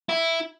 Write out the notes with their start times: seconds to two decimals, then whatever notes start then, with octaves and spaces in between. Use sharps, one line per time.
0.09 E4